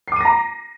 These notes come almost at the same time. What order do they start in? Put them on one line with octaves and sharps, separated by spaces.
C7 D6 D#7 A#6 A#5